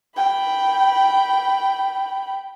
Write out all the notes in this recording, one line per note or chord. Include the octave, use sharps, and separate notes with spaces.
G5 B5